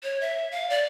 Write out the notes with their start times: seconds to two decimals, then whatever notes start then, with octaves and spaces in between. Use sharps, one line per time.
0.04 C#5
0.21 E5
0.51 F5
0.70 D5